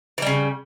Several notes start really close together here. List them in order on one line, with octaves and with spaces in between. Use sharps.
E3 G3 C#3